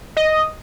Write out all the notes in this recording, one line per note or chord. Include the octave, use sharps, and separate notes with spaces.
D#5